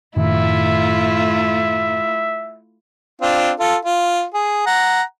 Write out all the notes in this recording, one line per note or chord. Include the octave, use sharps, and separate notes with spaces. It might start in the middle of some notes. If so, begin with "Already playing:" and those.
F#2 A2 D#3 A3 E4 F4 E5
C4 D4 F4
F4 A4
F4
G#4
F#5 A#5